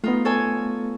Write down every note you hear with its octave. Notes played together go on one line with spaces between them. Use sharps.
A3 B3 D#4 F4
A4 C#5 G#5